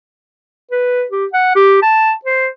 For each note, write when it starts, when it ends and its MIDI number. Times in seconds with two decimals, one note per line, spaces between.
0.71 1.04 71
1.11 1.25 67
1.34 1.54 78
1.56 1.78 67
1.82 2.13 81
2.25 2.48 72